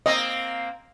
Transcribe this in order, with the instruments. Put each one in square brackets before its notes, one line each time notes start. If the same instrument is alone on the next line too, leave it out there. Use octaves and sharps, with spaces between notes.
[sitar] A#3 C4 [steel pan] D#5